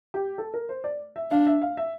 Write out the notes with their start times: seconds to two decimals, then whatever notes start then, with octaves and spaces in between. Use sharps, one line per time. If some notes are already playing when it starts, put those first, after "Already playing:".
0.14 G4
0.38 A4
0.54 A#4
0.69 C5
0.84 D5
1.16 E5
1.31 D4 F5
1.47 E5
1.62 F5
1.77 E5